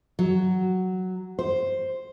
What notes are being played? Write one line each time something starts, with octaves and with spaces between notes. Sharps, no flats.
F#3
C5